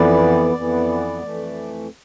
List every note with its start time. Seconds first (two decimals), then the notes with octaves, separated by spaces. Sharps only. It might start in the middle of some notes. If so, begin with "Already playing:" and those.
Already playing: F2 E3 B3 D5
0.55 F2 E3 B3
1.23 F2 E3 A3